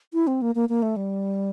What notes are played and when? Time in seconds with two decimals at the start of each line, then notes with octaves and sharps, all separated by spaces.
0.14 E4
0.27 C4
0.42 A#3
0.55 A#3
0.69 A#3
0.82 A3
0.96 G3